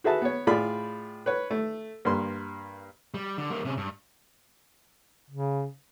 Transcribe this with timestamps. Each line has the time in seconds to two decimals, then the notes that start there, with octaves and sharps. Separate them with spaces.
0.04 F#4 G#4 B4 E5 A5
0.22 B3 C#5
0.47 A2 F4 G#4 D5 B5
1.26 B4 C#5
1.51 A3
2.05 G2 A#3 C6
3.14 G3
3.38 D3
3.50 G3 A#3
3.65 C3 C#4
3.77 G2
5.30 C#3